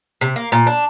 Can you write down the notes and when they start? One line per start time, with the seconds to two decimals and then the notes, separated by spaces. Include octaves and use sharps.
0.21 C3
0.36 A#3
0.52 A#2
0.67 D4